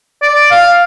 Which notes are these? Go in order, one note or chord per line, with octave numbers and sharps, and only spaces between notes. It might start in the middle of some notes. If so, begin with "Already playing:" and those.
D5
F5